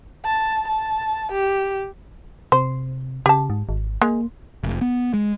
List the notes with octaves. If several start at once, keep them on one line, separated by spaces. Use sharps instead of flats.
A5
A5
G4
C3 C5
C#3 G4 A5
G#2
G#1
G#3 A#3
F1
B3
G#3